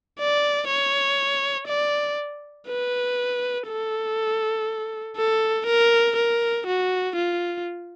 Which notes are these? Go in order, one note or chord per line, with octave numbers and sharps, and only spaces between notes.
D5
C#5
D5
B4
A4
A4
A#4
A#4
F#4
F4